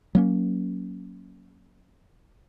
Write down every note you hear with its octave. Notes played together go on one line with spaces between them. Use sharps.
F#3 A#3 C#4